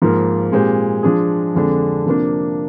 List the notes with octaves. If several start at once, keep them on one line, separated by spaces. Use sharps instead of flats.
G#2 F3 A#3 F4 A#4
A#2 G#3 C4 G4 C5
F3 G#3 D4 G#4
F2 D3 G#3 D4
C3 F3 A#3 D4